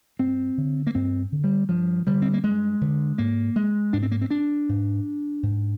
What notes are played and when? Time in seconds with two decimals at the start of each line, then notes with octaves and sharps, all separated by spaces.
0.19 G2 C4
0.58 D3
0.87 A#3
0.95 G2 C4
1.32 D3
1.44 G3
1.69 G2 F3
2.07 D3 G3
2.22 C4
2.33 A#3
2.44 G2 G#3
2.81 D3
3.18 G#2 A#3
3.56 G#3
3.93 G#2 D4
4.03 C4
4.11 A#3
4.21 C4
4.30 D4
4.69 G#2
5.43 G#2